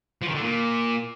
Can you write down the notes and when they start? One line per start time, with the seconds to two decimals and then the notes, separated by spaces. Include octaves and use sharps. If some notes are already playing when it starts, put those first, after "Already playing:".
0.22 F3
0.28 D#3
0.35 D3
0.41 A#2